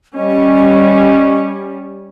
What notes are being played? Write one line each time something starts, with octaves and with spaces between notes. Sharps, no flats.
G3 C#4 D#5